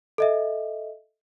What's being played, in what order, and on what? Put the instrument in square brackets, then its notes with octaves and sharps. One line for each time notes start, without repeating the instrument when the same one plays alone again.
[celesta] A4 D#5 E5